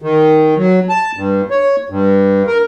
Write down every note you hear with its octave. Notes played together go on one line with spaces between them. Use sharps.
D#3
F#3
A5
G2
C#5
G2
A#4